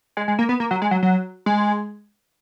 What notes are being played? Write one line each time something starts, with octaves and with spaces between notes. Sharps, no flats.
G#3
G#3
A#3
B3
A#3
F#3
G#3
F#3
F#3
G#3